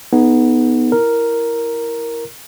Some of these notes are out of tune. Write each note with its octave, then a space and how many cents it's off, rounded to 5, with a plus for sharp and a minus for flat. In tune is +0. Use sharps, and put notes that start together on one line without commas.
B3 +0 D#4 +0 G#4 +40
E4 +0 A#4 +0